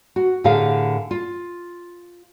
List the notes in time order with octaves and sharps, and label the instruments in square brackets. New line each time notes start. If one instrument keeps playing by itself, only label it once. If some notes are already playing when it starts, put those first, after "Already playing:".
[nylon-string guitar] F#4
A2 D3 G4 G#4 A#4 F5
F4